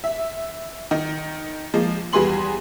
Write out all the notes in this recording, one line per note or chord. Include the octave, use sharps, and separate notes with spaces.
E5
D#3
F3 G#3 A#3
E2 G3 G#4 B4 C6 F#7